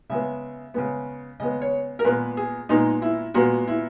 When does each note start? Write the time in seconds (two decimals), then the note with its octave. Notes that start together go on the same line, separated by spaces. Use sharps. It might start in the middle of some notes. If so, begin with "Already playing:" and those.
0.10 C#3 G#3 B3 E5
0.74 C#3 G#3 B3
1.40 C#3 G#3 B3 D#5
1.62 C#5
1.99 A#4
2.05 A#2 G#3 B3 B4
2.37 G#4
2.69 A#2 G#3 B3 D#4
3.02 E4
3.34 A#2 G#3 B3 F#4
3.68 E4